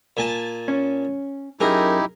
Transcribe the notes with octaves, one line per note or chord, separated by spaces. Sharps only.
A#2 G#5 A5
C#4
F#2 D#4 E4 G4 G#4 A#4